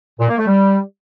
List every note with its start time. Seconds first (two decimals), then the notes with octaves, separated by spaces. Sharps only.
0.20 A#2
0.29 A#3
0.38 A3
0.47 G3